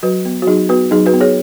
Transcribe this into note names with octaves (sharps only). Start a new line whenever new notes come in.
F#3 F#4 B4
B3
F#4
F#3 D#4 G#4
B3 F#4 B4
F#3 D#4 G#4
F#4 B4
B3
G#4 C#5